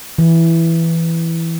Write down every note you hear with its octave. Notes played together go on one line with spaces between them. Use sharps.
E3